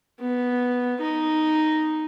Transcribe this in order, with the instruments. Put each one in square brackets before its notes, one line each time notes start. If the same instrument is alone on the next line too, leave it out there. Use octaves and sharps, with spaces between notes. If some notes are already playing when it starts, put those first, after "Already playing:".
[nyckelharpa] B3
D#4